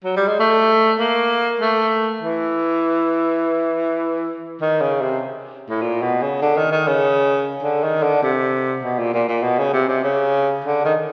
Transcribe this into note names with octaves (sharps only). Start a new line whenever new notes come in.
F#3
G3
G#3
A3
A#3
A3
E3
D#3
C#3
C3
A2
A#2
B2
C#3
D3
D#3
D#3
C#3
D3
D#3
D3
C3
B2
A#2
A#2
A#2
B2
C#3
C3
C3
C#3
D3
D#3